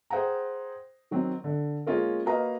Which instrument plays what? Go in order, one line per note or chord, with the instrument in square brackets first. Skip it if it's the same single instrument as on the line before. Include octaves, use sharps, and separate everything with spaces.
[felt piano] G#4 C5 F#5 G5 A#5
D#3 F#3 C4
D3
G#3 A#3 C#4 F4 A#4
A#3 F#4 B4 D#5 F5 A#5